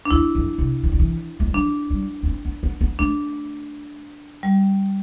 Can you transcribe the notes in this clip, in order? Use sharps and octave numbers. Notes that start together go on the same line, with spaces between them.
D4
E2 E4
F2
C3
E3
D3
E3
A3
G3
F3 D4
G3
B3
C4
B3
B3
B3
A3 D4
G3